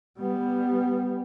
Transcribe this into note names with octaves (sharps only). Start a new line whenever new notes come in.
G3 B3